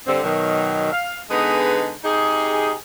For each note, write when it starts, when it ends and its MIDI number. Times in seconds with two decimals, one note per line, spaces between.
0.07 0.20 43
0.07 0.20 50
0.07 0.20 60
0.23 0.89 47
0.23 0.89 51
0.23 0.89 54
0.92 1.19 77
1.30 1.92 50
1.30 1.92 56
1.30 1.92 59
1.30 1.92 63
1.30 1.92 68
1.30 1.92 71
2.04 2.73 48
2.04 2.73 63
2.04 2.73 67
2.04 2.73 68